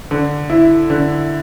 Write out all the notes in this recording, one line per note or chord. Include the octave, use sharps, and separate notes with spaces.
D3
E4
D3